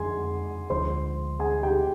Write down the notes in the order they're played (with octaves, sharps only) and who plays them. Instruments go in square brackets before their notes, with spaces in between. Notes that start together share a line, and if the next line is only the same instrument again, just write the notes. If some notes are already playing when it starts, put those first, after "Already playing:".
Already playing: [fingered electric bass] F2 D3 G#3 [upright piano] G#4 G#5 C6
[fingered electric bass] D2 D3 F3 G#3 [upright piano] C5 C6
[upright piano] G#4 G#5
G4 G5